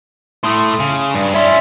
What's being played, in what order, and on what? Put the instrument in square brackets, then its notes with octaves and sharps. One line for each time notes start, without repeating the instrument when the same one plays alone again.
[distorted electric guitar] A2 A3 [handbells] C6 D#6
[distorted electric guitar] C#3
G2
[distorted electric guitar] C#4 E4 [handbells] D5 E5 C6